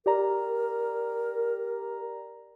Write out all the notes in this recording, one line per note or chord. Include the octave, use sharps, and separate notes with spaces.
G4 A#4 D5 A#5